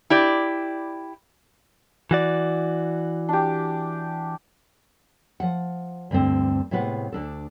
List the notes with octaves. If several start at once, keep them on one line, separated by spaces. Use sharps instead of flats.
E4 G4 D5
E3 F#4 D5
D4 G4
F3 F#5
D2 G2 D3 C4
A2 C3 G#3 B3 B4 F#5
D2 D4 A4